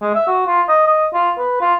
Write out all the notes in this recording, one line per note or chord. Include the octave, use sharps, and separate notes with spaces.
G#3
E5
F#4
F4
D#5
D#5
F4
B4
F4